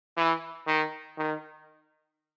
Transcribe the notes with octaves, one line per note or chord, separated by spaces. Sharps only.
E3
D#3
D#3